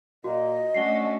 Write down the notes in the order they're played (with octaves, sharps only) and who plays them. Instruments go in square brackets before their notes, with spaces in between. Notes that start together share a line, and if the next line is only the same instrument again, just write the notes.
[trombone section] A#2 A#3 [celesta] F#4 [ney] D#5
[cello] A3 [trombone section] C#4 D4 F#4 [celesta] C7 G7